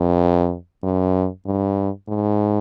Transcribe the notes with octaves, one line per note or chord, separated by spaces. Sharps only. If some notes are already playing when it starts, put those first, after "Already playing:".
Already playing: F2
F#2
G2
G#2